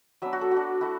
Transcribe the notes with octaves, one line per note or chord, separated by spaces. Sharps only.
F#3 B3 D4 E5
F#4
A4
F#3 F#4
D4
A3 E4 F#4